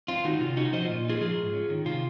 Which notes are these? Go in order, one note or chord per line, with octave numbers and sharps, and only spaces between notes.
C4 F4
D#3 D#4 F#4
C3 F4
C#4 D#4 F#4
F3 C5 D#5
A#2 F4
D#4 F4 G#4
F3 F4 G#4
G#2
C#4
D#3
C3 F4